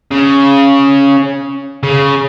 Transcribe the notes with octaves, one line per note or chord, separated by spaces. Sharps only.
C#3
C#3